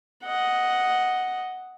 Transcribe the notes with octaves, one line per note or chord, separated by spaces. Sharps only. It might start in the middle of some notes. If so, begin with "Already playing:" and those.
D#5 F#5